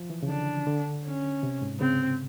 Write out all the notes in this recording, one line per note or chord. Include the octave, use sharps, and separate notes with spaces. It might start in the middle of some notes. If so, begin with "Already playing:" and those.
Already playing: F3
E3
C#3
D3 D4
D3
C#4
C3
G#2
C#3 C4